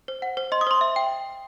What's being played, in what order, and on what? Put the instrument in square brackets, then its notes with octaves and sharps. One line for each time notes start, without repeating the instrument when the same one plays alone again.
[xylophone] C5
F#5
C5
D#5 C6
D#6
C5 C6
E5
G5